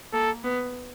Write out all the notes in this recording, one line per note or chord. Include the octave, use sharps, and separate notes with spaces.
A#3 A4
B3